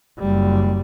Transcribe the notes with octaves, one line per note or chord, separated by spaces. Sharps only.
F#1 G3